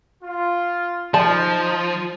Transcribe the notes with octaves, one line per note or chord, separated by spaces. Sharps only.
F4
F3 D#4 D5 A5